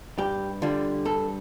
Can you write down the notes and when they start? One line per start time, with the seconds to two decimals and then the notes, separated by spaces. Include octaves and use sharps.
0.18 G2 G4
0.62 D3 G3 F4
1.05 G2 A4